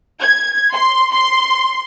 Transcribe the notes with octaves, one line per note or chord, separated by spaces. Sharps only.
G#6
C6
C6